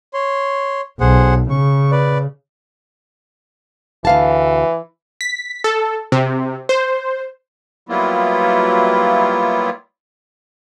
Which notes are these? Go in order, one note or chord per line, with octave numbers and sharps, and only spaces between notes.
C#5 C6
B1 G#4 C5 F#5
C#3 C#6
B4 D5
D2 E3 F5 A5
B6
A4
C3
C5
F#3 G3 A#3 B3 E4 F4